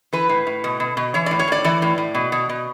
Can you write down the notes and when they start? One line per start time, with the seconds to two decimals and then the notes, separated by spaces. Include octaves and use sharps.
0.13 E3 B4
0.29 A2
0.47 A2
0.64 B2
0.80 B2
0.97 B2
1.14 E3 C#5
1.26 D5
1.31 A2
1.39 C#5
1.48 A2 D5
1.64 E3 D5
1.82 A2
1.98 A2
2.15 B2
2.32 B2
2.49 B2